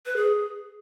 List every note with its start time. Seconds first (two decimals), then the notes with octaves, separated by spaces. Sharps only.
0.06 B4
0.16 G#4